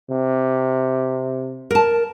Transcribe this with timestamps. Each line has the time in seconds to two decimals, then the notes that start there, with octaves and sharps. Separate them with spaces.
0.10 C3
1.71 A#4 A5